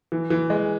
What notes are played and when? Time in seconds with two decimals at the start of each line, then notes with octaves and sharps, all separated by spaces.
0.12 E3
0.30 E3
0.50 G#3